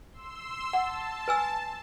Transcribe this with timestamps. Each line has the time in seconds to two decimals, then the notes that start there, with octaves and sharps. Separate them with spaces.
0.11 C6 E6
0.73 F#5 A5
1.28 B4 G#5 E6